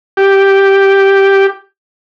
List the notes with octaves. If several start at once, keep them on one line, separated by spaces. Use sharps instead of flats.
G4